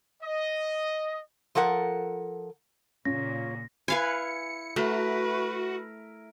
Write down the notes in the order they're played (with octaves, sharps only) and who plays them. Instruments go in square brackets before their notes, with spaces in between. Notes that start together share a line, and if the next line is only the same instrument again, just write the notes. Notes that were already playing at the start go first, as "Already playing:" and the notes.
[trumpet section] D#5
[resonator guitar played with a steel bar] F3 A4 A#4 F#5
[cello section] A#2 C#3 [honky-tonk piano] C#4 [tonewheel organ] F4 C#5 [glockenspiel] A#6
[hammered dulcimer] E4 [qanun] B4 F5 G#5 [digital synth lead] C#7
[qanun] A3 [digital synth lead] F#4 [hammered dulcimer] A#4 E5 [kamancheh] B4